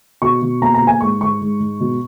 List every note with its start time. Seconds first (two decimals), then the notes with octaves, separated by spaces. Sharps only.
0.22 B2 C#6
0.42 B2
0.62 A#2 A#5
0.74 A#5
0.82 A#2
0.87 G#5
1.01 G#2 C#6
1.21 G#2 C#6
1.41 G#2
1.60 G#2
1.80 B2